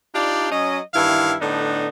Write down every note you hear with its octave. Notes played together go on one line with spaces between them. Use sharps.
D4 D#4 F4 G4 D5
F#3 C#4 D#5
G2 D#3 E3 E4 F5
A2 D3 B3 D4 D#4